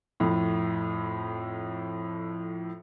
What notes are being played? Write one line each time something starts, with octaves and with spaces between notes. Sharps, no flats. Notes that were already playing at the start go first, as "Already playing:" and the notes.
F2 A2